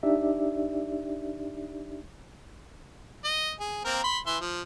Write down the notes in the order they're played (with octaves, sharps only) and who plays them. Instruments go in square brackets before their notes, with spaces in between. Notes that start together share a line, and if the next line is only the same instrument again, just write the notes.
[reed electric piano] D4 D#4 G4 D5 E5
[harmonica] D#5
G#4
A#3 C4 A#4
B5 C6
E3 E5 C6
F3